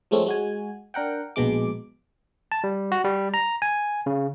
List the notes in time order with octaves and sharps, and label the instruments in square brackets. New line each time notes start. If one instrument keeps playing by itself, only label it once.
[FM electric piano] F3 G#3 A3 C4 C#4
G#3 F#4 G#5
D4 A#4 F#5 G5
A#1 B2 G#3 D6
[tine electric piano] A5
G3
F#4
G3
A#5
G#5
C#3